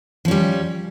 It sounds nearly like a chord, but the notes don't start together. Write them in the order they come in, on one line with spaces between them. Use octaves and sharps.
F3 C#4 G3